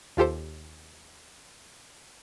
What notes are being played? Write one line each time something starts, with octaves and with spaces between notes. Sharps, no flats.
D#2 F4 G4 A4 C5